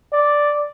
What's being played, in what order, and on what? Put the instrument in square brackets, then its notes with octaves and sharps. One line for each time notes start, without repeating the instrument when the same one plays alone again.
[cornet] D5